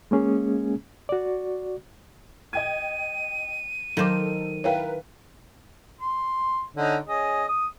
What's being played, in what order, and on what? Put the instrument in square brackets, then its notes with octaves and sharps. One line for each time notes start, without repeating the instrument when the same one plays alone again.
[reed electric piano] G#3 A#3 C#4 G#4
F#4 D5
[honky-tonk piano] D#5 G5 G#6 [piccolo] D#7
[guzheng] D#3 C5 [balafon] F#3 D6 [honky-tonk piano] D#4 A4
[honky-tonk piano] E4 A#4 B4 [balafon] C#5 F5 G5
[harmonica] C6
D3 C#4 D#4
C#4 G#4 D#5
D#6